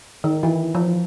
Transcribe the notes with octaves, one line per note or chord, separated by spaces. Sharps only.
D#3
E3
F3